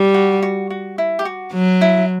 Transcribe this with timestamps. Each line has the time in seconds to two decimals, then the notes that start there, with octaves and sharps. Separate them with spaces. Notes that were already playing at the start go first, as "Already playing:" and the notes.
Already playing: G3
0.14 F#4
0.42 F#4
0.70 F#4
0.98 E4
1.19 G4
1.25 F#4
1.53 F#3
1.81 E4